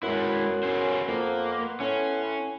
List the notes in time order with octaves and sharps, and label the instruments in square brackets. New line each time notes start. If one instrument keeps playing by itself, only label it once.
[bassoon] F#2 [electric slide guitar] G#3 E4 [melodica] B3 B4 C6
[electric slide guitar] C#4 G#4 C5
[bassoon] F2 [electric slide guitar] A#3
[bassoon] A2 [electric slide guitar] C#4